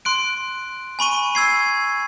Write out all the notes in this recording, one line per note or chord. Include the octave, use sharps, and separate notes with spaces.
C6 F#6 D7
G#5 B5 C#6 D#7
E6 G#6 C7